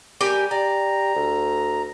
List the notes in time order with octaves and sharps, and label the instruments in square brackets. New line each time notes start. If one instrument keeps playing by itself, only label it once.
[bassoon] G3 [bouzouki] G4 A#4 G#5
[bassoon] G4 [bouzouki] D5 [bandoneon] A#5
[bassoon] D2